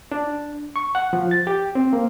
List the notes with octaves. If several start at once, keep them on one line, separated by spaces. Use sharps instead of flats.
D4
C#6
F#5
F3
A6
G4
C4
A#3